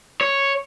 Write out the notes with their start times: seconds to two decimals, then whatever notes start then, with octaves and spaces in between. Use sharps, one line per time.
0.21 C#5